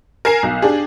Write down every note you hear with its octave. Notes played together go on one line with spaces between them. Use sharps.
A#4 G#5 C7 E7
B1
D4 G4 G#4